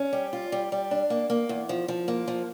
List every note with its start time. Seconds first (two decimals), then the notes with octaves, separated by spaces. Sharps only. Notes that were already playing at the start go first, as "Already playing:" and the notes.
Already playing: C#4
0.13 G3
0.33 F4
0.52 G3
0.72 G3
0.91 D4
1.10 A#3
1.30 A#3
1.49 E2
1.69 F3
1.88 F3
2.08 A#3
2.28 F3